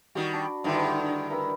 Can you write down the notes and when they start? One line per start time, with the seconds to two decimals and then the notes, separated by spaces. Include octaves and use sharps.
0.15 D#3 G3 F#4 C#6
0.33 D4 B5
0.64 G2 D3 D#3 E4 F#5 G5
0.84 A3
1.30 A#4 B4 E6